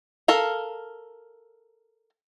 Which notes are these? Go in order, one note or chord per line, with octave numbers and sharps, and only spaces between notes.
A4 A#4 F5